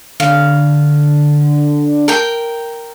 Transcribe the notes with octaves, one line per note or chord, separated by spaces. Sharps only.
D3 F5
A#4 G5